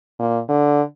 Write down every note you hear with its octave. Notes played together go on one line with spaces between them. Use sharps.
A#2
D3